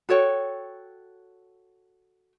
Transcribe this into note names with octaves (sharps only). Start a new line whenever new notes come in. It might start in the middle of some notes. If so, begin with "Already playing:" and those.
F#4 A4 C#5 G5